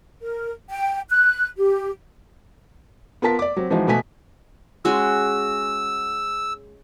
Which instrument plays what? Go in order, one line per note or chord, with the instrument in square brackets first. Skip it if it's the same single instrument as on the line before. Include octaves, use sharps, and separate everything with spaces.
[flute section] A#4
G5
F#6
G4
[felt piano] B3 F4 A#4 A5 B6
D5 D6
F#3 C4
E3 F3 G#3 D#4 F#4
B2 A3 B3 G#5 B6
[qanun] G#3 C#4 F#4 [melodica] E6